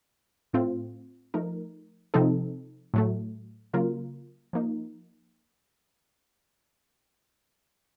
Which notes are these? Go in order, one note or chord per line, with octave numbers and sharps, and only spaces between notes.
A2 A3 C4 F4
F3 A3 D#4 A#4
C3 F3 C4 D#4 A4
A2 F#3 A3
C#3 F#3 A#3 F4 A#4
F3 A#3 D#4